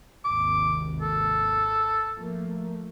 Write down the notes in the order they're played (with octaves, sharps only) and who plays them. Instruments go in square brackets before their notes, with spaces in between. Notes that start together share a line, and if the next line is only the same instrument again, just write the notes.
[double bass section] G#1 D#2 C3 [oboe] D6
[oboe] A4
[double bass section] F3 A3 A#3